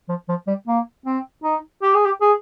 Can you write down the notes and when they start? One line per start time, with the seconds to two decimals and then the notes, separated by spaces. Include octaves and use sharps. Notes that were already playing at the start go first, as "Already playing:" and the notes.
0.09 F3
0.29 F3
0.47 G3
0.68 A#3
1.06 C4
1.44 D#4
1.83 G4
1.95 G#4
2.05 G4
2.21 G#4